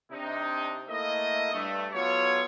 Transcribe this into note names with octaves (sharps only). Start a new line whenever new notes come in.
C3 D4 D#4
A3 A#3 E4 D#5
G2 A3
F#3 B3 F4 A4 C#5